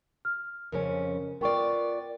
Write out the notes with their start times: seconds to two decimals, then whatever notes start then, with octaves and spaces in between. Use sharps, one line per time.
0.25 F6
0.72 F2 C#3 C#4 A#4
1.41 B3 F4 A#4 D5 G5 C#6